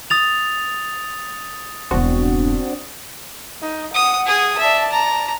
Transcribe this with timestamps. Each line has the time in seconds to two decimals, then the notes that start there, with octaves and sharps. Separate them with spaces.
0.10 D#6 A6 F7
1.91 E1 G2 C4 D4 F#4
3.61 D#4
3.94 F#5 D#6
4.26 G#4 D#6
4.58 D5 E5 A5
4.92 A#5